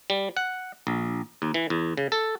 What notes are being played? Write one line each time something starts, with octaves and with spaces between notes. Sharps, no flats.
G3
F#5
A#1
D#2
E3
E2
C#3
A4